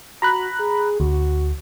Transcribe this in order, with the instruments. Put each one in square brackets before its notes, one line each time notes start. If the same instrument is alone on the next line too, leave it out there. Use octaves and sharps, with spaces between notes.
[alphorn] F#4 [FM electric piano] A#5 B5 F#6
[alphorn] G#4
[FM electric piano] D2 [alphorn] F#4